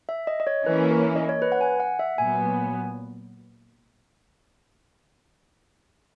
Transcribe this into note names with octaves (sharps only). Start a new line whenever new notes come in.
E5
D#5
D#5
C#5
E3 A#3 C#4 E4 B4
A#4
D#5
C#5
B4
F#5
G#5
F#5
E5
A#2 F#3 B3 G#5